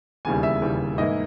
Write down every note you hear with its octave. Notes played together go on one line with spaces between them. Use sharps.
E1 D#2 C#3 E3 G3 G#5
E5
E1 D#2 C#3 E3 G3
G#2 E3 A#3 E4 D#5